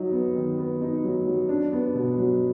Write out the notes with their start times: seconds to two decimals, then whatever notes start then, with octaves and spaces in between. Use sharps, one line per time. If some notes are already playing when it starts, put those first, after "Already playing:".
Already playing: F#3 D#4
0.12 B3
0.35 D#3
0.58 B3
0.81 D#4
1.04 F#3
1.27 F#3
1.49 D4
1.72 B3
1.94 B2
2.18 F#3